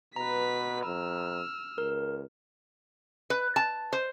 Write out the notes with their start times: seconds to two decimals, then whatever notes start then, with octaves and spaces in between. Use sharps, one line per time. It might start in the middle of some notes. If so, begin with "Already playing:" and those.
0.16 B2 B4 A#5 B6
0.86 F2 E6 F6
1.78 C#2 A#4
3.30 B4
3.56 A5
3.93 C5